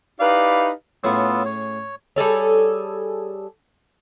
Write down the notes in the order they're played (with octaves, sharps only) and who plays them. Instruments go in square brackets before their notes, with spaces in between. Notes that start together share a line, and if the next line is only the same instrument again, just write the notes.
[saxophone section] D#4 E4 G4 B4 D5 F5
[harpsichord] A2 C#4 G#4 [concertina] B3 F4 E6
[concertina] C#5
[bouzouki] G3 G#4 A4 C#5